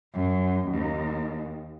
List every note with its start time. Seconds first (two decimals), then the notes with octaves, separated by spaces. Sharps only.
0.14 F#2
0.69 D#2